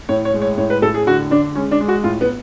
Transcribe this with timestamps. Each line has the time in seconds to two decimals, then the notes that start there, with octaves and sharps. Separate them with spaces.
0.09 A2 C#5
0.25 C#5
0.34 G#3
0.42 C#5
0.58 A2 C#5
0.70 B4
0.82 A2 A4
0.94 G#4
1.06 D3 F#4
1.31 D3 D4
1.55 G#3 C#4
1.71 D4
1.80 G#3
1.88 F#4
2.04 A2 F4
2.21 B3